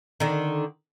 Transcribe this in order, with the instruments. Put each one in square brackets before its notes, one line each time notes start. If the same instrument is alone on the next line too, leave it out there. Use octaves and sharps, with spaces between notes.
[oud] D3 D#3